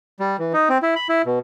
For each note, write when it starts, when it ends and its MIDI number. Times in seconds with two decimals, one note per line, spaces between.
0.20 0.37 55
0.39 0.53 52
0.53 0.69 63
0.70 0.78 60
0.82 0.95 64
0.96 1.08 83
1.09 1.22 64
1.26 1.39 47